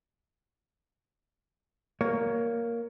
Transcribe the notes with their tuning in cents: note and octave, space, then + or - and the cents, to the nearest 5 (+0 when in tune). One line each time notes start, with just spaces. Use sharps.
A#3 +0 C#5 +20